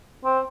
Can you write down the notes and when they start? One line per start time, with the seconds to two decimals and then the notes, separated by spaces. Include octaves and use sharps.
0.25 C4